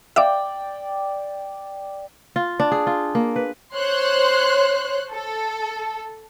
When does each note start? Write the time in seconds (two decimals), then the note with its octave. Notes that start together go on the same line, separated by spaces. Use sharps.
0.16 D5 E5 F5 G5 D6
2.36 F4
2.60 D4
2.72 G#4
2.87 F4
3.15 A#3
3.36 B4
3.76 C5 C#5 C6 F#6
5.13 A4